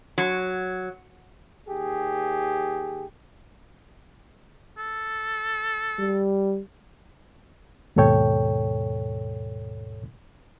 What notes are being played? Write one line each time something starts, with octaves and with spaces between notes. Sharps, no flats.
F#3
D#2 G4 G#4
A4
G3
D#2 G#2 B2 A4 C#5 G5